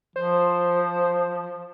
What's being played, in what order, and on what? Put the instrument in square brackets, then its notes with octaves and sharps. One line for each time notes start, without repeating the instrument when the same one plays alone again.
[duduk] F3 [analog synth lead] C5